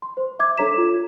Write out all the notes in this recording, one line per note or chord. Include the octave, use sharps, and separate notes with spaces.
C6
C5
E5 D6 G#6
D4 A4 C#5 A#5 B6 E7
F4